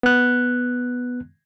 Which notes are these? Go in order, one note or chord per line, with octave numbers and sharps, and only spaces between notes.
B3 F#6